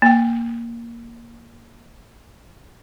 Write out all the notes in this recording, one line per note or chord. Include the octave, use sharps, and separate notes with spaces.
A#3 G5